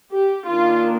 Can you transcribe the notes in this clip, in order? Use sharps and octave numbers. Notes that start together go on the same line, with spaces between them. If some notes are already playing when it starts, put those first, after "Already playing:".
G4
D#3 A#3 D4 F4